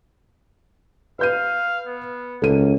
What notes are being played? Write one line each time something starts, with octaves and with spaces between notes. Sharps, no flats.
B4 F5 G6 D#7
B3
C#2 A#3 A4 D#7